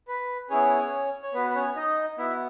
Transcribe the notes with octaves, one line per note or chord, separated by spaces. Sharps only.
B4
B3 C#4 E4 G#4 C#5
C#5
B3 F#4 B4
B4
C#4 C#5
D#4 D#5
B3 E4 F#4 E5